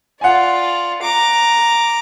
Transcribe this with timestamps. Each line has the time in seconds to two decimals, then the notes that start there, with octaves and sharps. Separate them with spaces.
0.21 F4 D5 F#5 G#5
1.02 A#5 D6